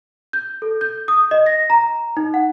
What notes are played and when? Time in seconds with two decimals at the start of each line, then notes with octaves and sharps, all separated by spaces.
0.33 G6
0.62 A4
0.81 G6
1.08 D#6
1.31 D#5
1.46 A#6
1.70 A#5
2.17 D#4
2.34 F#5